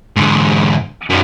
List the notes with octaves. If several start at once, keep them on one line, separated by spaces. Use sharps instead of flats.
G#2 D3
F#2 D#3